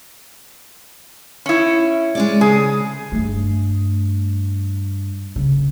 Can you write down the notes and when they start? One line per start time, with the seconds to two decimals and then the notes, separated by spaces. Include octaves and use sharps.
1.46 C#4 E4
2.15 G#3 C#4 D5
2.41 C#3 G#4
3.12 G2 A3
5.36 C#3